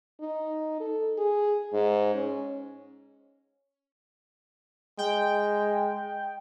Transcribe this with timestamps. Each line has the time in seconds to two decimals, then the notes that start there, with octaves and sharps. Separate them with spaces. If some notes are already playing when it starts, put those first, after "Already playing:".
0.20 D#4
0.80 A4
1.18 G#4
1.73 G#2
2.14 C#4
4.98 G#3 G5